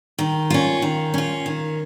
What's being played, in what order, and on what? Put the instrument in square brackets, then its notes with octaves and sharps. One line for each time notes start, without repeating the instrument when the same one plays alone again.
[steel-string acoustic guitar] D#3
C#4 F4
D#3
C#4 F4
D#3